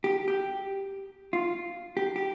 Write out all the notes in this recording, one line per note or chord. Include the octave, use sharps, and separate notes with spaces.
G4
G4
F4
G4
G4